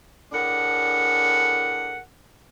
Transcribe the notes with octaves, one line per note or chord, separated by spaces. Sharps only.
A2 D4 G#4 A#4 F#5